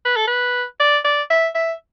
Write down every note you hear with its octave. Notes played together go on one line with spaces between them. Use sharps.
B4
A4
B4
D5
D5
E5
E5